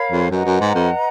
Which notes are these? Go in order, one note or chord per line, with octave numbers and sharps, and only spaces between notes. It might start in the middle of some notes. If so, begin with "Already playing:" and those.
Already playing: A#4 C#5 F5 B5
F2
F#2 B4 D#5 F#5 A#5
F#2
G#2
F2